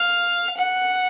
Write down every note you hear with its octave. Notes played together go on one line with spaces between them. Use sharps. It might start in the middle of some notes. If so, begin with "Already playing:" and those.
Already playing: F5
F#5